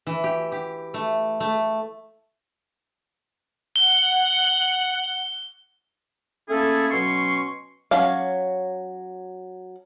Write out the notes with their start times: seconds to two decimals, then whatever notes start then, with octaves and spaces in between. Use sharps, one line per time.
0.07 E3
0.24 G4
0.52 G4
0.94 A3
1.40 A3
3.76 F#5 F#6 G7
6.49 A3 A#3 C#4 E4 G#4 A4
6.90 B2 F#3 C#4 C6 C#6
7.91 F#3 C#4 C#5 F5